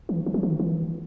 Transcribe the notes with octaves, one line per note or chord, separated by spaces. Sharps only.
E3
E3
F#3
E3
D#3
E3